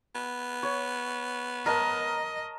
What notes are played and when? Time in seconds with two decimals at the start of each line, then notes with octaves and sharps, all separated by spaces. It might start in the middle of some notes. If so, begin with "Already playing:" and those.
0.15 B3
0.63 C#5
1.66 A#4 D#5 A5